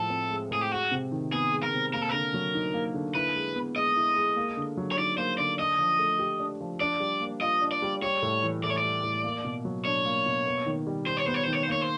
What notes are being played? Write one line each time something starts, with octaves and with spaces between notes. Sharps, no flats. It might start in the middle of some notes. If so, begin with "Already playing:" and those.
Already playing: A2 F3 G#3 A4
C4
G#3
A2 G#4
G4
G#3 F#4
C3
D#3
B3 G#4
G#3
A#4
C3
A#3 A#4
A4
D3 A#4
F#3
D#4
A#3
D3
E4 B4
G#3
B3
G#3 D#5
E4
G#3
A#3
D3
F#3
C#5
D#4 D5
A#3 C5
D3 D5
D4 D#5
F3
A3
G4
D4
F3
D4 D5
G3
A#3
F4 D#5
D4
D5
G3
G3 C#5
A2
E3
A2 D5
C#5
D5
G3
A2
A#3
B2
F#3
D4 C#5
A#3
B2
B3
D#3
G3
D#4 C5
C#5
B3 C5
C#5
D#3 C5
C#5
C5
A#3 C#5
C5